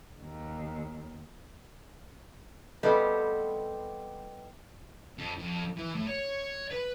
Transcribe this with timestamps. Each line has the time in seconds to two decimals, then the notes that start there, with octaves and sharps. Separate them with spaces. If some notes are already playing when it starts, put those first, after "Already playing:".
0.21 D#2
2.83 B2 G3 A3 B3 C4 G4
5.18 F2
5.39 F2
5.77 E3
5.95 A2
6.07 C#5
6.71 B4